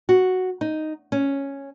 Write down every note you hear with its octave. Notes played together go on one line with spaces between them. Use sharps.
F#4
D#4
C#4